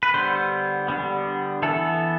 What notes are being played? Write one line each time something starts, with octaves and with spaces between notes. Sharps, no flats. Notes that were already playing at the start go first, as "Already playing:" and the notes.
B4
D3 G3 B3 C5
D3 G3 B3
E3 B3 A4